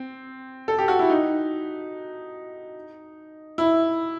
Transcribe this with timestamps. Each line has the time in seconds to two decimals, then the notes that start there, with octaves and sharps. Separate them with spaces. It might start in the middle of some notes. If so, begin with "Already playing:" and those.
Already playing: C4
0.68 A4
0.78 G4
0.88 F#4
0.99 E4
1.09 D#4
3.58 E4